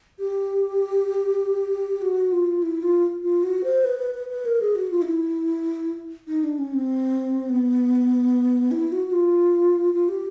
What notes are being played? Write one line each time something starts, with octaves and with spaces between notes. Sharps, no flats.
G4
F#4
F4
E4
F4
F4
F#4
C5
B4
B4
B4
B4
A#4
G#4
F#4
F4
D#4
E4
D#4
D4
C#4
C4
B3
E4
F#4
F#4
F4
F4
G4